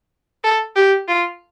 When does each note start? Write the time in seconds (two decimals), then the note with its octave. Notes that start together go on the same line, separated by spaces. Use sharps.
0.44 A4
0.76 G4
1.08 F4